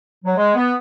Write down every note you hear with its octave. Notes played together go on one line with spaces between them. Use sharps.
F#3
G#3
B3